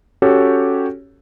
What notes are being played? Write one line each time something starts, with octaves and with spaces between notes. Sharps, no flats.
C#4 F#4 G4 A4 C#5